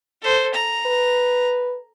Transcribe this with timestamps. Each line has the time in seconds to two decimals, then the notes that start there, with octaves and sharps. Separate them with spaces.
0.22 A4 C5
0.54 A#5
0.86 B4